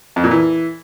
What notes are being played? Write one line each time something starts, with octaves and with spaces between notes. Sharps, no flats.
F2
A#2
E3